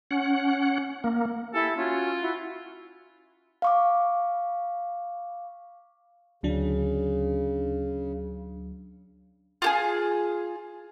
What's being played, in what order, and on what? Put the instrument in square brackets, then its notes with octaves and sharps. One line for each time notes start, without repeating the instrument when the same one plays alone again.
[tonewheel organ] C#4 F#5
A#3
[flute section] E4 G4 G#5 [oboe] A4
[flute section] C#4 F#4 [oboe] F4
[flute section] E4 F#4
[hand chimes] F5 C#6 D6
[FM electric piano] D2 F#3 D4 [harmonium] C#3
[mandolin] F4 G4 G#4